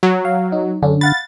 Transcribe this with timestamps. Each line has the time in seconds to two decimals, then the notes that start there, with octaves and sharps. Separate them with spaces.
0.03 F#3
0.25 F5
0.52 D#4
0.83 F#2 D3 C#4 D4
1.01 F5 F#5 B5 A6